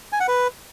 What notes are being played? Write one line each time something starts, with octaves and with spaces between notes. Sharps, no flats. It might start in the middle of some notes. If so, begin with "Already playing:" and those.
G#5
F#5
B4